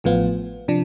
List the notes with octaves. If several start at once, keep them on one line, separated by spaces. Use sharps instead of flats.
A1 A2 F3 B3 F4
C3 F3 D4